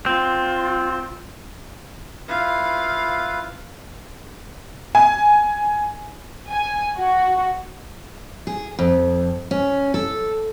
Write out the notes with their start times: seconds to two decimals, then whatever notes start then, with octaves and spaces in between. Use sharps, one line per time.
0.06 C4 F4
2.29 E4 F4 B4 F5
4.95 G#5
6.49 G#5
6.98 F#4
8.47 G#4
8.79 F2
9.51 C#4
9.94 A4